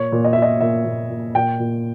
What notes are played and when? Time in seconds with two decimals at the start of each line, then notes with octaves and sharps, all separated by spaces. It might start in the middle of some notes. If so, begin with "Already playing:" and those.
Already playing: A#2 C#5
0.12 A#2
0.24 D#5
0.33 E5
0.37 A#2
0.42 D#5
0.61 A#2 E5
0.85 A#2
1.10 A#2
1.35 A#2 G5
1.60 A#2